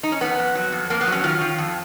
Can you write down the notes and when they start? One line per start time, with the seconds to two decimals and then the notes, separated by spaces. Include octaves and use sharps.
0.03 D#4
0.12 C#4
0.21 F2 B3
0.39 F2
0.55 F#3
0.72 F2
0.90 F2 A#3
1.01 B3
1.07 F#3
1.12 C#4
1.24 D#3 F4
1.41 D#3
1.58 F2